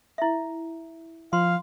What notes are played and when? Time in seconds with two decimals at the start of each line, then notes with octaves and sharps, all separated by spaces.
0.18 E4 E5
1.33 F3 F5 C6